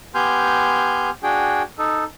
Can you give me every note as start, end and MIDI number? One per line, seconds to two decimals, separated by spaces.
0.15 1.10 59
0.15 1.10 67
0.15 1.10 80
0.15 1.10 84
0.15 1.10 89
0.15 1.10 91
1.23 1.62 62
1.23 1.62 66
1.23 1.62 68
1.23 1.62 79
1.78 2.04 63
1.78 2.04 69